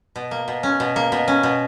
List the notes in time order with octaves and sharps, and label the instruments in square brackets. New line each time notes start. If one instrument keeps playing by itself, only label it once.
[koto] B2
A#3
B2
C#4
B2
A#3
B2
C#4
B2